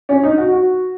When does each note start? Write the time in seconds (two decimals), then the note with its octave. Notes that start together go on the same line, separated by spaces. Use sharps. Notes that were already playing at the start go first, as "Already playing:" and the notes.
0.09 C#4
0.23 D#4
0.37 F#4
0.52 F#4